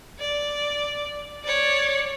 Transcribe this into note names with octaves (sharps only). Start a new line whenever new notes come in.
D5
C#5 D5